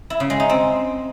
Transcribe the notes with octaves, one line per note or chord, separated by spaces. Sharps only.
E4
C#3
G#3
D#4
C4